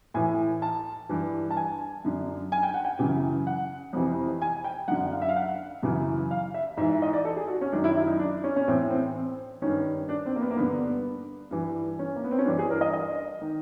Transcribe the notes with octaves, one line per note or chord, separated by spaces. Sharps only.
A2 E3 G#5
A5
G2 E3
A5
G#5
F#2 D3
G#5
G5
F#5
G5
F#2 C#3 E3
F#5
F2 C3 E3
G#5
G5
F#2 D3 F#5
F5
E5
F5
F#5
F#2 C#3 E3
F5
E5
G#2 E3 E5
E5
D#5
D5
A4
G#4
F#4
C#4
F#2 D#3 D4
E4
E4
D#4
D4
C#4
C#4
A2 E3 C4
C4
C4
G2 D#3 C#4
D4
C4
A#3
B3
A#3
G2 D3 B3
G2 E3
C#4
A#3
B3
C4
C#4
G2 E3 D4
G#4
A#4
D#5
D#5
D#3